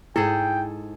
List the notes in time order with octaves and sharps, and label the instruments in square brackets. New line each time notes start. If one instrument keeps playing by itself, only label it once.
[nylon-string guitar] G#2 [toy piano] E4 [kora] G#4 A4 [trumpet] G5